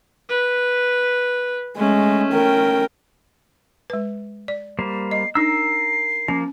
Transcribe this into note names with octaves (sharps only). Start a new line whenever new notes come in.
B4
G#3 A3 C#4
A#4 G5
G#3 B4
D5
G3 A#3 C5
D#5 C7
D4 D#4 A#4 E6 C7
F3 A#3 C#4